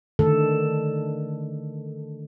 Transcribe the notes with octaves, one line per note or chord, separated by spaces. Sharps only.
D3 D#3 A3 A4